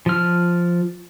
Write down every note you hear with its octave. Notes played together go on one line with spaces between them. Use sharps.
F3 F6